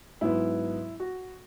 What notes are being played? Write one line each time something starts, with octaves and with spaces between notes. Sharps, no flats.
G#2 F#3 B3 E4
F#4